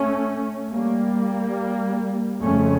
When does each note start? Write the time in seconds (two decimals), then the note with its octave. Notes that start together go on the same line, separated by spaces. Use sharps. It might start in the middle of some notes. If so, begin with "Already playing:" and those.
Already playing: A3 C#4
0.72 G3 A#3
2.42 F2 C#3 A3 C#4